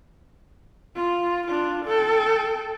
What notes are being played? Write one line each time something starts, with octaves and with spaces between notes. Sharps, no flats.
F4
D4 F4
A4 G5